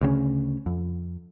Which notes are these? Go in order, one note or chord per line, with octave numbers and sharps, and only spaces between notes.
D2 C#3 C4 C#4
F2